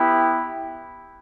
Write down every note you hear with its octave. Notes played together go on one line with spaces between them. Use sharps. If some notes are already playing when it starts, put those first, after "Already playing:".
Already playing: B3 E4 G4